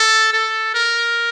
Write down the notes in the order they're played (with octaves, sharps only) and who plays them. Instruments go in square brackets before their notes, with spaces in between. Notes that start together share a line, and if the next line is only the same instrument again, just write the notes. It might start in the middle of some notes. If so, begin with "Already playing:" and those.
Already playing: [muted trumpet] A4
A4
A#4